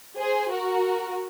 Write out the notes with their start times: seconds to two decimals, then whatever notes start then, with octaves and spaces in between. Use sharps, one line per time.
0.18 G#4 C5
0.51 F#4 A#4